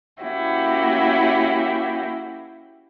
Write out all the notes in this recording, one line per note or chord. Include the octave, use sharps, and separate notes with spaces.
A#3 C#4 E4 F#4 G4